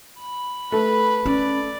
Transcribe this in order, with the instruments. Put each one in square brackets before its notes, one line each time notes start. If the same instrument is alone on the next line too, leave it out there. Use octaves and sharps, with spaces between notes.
[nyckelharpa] B5
[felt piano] A3 [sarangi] B4
[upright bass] C#4 [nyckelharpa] D5